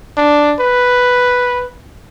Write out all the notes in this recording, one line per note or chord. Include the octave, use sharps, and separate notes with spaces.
D4
B4